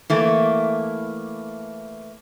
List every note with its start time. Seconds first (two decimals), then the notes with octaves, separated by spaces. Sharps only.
0.10 E3 A3 A#3